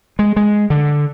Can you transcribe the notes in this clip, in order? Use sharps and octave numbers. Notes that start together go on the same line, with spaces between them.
G#3
G#3
D3